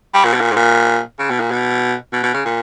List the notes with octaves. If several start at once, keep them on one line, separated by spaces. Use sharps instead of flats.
G3
A#2
B2
A#2
G#2
A#2
C#3
B2
A#2
B2
B2
B2
C#3
A#2